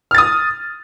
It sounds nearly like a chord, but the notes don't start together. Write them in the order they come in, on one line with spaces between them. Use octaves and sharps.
F6 A6 D#6